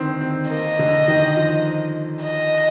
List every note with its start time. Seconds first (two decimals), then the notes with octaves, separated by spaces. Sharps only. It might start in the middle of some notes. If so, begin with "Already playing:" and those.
Already playing: D3 D#3 C4
0.21 C4
0.50 A#3 D#5
0.79 D3
1.08 D#3
1.37 F3
2.24 D#5